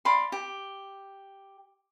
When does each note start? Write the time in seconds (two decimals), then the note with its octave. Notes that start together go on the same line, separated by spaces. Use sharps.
0.05 D5 F5 B5 C6
0.32 G4